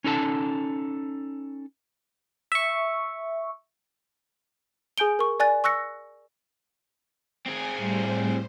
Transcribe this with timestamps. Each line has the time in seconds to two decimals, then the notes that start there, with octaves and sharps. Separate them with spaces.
0.04 C#4 D#4 A4 A5
2.52 E5 C#6
4.98 G#4 G#5 G6 D7 G7
5.19 A#4 C#6
5.40 D5 G#5 F#6 A6
5.64 C#6 E6 F#6 A#6 C#7
7.46 C4 G#4 G#5
7.78 A2 G3 C5